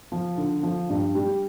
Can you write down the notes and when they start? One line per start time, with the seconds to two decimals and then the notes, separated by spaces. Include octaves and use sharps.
0.12 F3
0.37 D3
0.63 F3
0.90 G2
1.15 G3